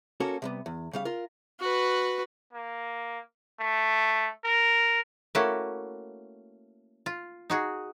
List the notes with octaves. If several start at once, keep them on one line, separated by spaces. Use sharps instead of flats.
A#3 C#4 F#4 A4 A#4
C3 G3 B3
E2
C#3 G3 F5
F4 A#4
F#4 B4
A#3
A3
A#4
A3 A#3 C#4 E4 F#4
F4
D#4 F#4 G#4